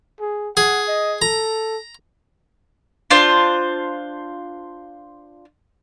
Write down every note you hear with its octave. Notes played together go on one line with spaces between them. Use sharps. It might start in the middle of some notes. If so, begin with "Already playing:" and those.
G#4
G#4 F#5
D#5
A4 A#5
D4 F4 C5